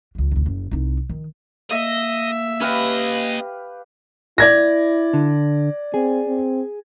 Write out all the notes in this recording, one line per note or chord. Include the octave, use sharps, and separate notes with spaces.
C#2 F#3
F1 D2
F#1
C2 D#4
D#3
A#3 D#5 E5
C#4 G4 B4 D#5 F5
E4 D5 G#6 A#6
D3
C4 G#4
C4